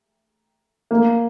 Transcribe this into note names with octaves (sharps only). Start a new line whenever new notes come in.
A#3